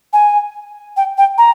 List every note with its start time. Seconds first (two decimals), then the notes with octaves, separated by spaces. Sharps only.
0.13 G#5
0.97 G5
1.18 G5
1.38 A#5